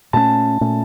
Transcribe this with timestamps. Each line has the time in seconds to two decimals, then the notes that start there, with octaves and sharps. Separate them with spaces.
0.13 A#2 A3 C#4 A5
0.61 A#2 A3 C#4